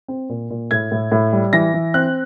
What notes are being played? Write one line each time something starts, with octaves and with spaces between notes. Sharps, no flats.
C4
A#2
A#2
A2 G#6
A2
A2
G3
E3 A#6
E3
C4 F#6